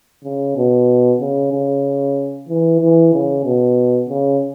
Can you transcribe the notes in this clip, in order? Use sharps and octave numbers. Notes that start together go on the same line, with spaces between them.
C#3
B2
C#3
C#3
E3
E3
C#3
B2
C#3